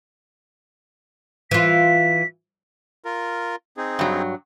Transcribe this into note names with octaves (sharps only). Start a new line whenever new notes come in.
E3 F4 B6
F4 A#4
C4 D#4 G#4
G2 F#3